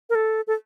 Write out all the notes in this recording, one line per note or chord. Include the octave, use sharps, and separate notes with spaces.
A#4
A4
A4